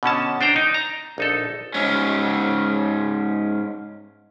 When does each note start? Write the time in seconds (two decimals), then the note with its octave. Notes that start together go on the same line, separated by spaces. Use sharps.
0.03 B2 D3 C#4 A5
0.41 D4 C5 D5 G5 A#5
0.56 D#4
0.74 A#5
1.18 A#1 D#4 A4
1.74 G#2 C#4